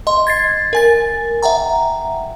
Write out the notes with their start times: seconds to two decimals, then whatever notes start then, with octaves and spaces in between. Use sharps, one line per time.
0.07 D#5 C6
0.27 G#6 A6 C7
0.73 A#4 G#5 A6
1.43 E5 F#5 G5 A#5